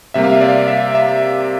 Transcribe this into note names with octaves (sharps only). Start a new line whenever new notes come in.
C3 G3 A#3 E5
F5
E5
D5
E5
E5